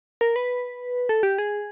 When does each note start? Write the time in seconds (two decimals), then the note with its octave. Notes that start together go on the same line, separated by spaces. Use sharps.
0.21 A#4
0.36 B4
1.09 A4
1.23 G4
1.38 G#4